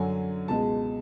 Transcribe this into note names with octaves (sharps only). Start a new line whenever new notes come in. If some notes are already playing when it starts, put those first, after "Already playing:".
Already playing: F#2 D3 F#3 G#5
C#2 B2 G#3 A5